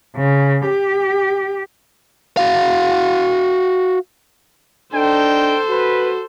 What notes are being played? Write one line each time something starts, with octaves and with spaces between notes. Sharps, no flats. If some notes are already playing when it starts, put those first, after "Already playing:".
C#3
G4
F#4 F5
D4 D#4 A4 C5 G5
F#4 B4